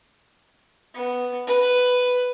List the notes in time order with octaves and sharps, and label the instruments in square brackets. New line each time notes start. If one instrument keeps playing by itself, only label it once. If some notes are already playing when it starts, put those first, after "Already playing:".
[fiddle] B3
B4